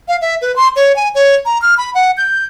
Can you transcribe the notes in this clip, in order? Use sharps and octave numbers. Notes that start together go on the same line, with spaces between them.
F5
E5
B4
C6
C#5
G#5
C#5
A#5
F6
B5
F#5
G6